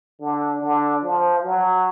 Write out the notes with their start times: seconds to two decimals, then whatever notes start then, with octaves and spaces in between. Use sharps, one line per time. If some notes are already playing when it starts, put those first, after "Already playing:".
0.20 D3
0.61 D3
1.03 F3
1.44 F#3